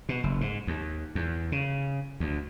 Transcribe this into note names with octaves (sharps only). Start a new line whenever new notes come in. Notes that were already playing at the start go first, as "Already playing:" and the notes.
B2
F#1
G#2
D#2
E2
C#3
D2